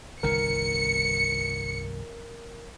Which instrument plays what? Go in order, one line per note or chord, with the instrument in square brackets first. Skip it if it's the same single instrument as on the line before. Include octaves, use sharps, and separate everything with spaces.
[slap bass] G1 C2 D#3 [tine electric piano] A#4 [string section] C#7